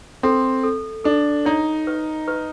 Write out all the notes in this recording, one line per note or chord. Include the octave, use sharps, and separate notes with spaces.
C4 A4
A4
D4 A4
D#4 C#5
B4
B4